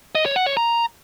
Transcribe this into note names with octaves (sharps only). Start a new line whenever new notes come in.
D#5
C#5
F#5
C#5
A#5